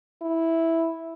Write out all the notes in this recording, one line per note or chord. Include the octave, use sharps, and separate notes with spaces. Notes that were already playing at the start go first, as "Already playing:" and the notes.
E4